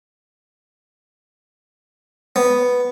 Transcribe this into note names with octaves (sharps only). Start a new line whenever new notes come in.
B3